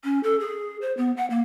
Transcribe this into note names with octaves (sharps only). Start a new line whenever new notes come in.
C#4
A4
G#4
C5
B3
F#5
A#3